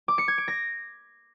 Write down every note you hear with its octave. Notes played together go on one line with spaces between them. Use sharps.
D6
C#7
G#6
D7
A#6